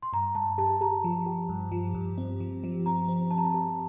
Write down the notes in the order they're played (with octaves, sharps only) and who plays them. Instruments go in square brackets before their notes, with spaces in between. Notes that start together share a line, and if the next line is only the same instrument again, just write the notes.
[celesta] C6
[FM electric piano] G2 [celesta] A#5
[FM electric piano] G2 [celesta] A5
[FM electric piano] G4 [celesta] A5
[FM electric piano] G4 [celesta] A#5
[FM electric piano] F3
G4
G2
F3
G2
C4
F3
F3
[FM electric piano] C4 [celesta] A#5
[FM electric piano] C4
[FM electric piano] C4 [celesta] A5
[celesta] A#5
A5
[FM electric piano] G4